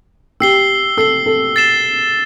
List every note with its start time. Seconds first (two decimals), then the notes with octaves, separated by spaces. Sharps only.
0.40 G4 E6 C7 G7
0.97 A4 E6 C7 G7
1.26 A4
1.56 A6 C7 E7 G7